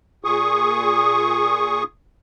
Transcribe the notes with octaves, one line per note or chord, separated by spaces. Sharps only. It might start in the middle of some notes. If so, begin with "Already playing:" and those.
A#2 G#4 C#6 D#6